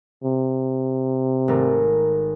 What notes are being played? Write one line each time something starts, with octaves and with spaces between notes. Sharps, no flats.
C3
G#1 A3 A#4